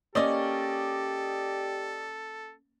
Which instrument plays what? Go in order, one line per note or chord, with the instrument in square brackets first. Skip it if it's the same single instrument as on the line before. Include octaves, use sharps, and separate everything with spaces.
[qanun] A#3 C#4 [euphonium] G4 [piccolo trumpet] A4 [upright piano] D5 D#5